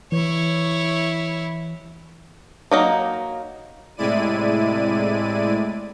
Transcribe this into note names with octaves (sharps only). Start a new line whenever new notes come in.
E3 E4 C#5
F#3 A#3 D#4
A2 C3 G#3 E4 D5 D#7